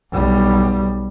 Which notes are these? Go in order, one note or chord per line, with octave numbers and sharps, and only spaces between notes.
B1 G3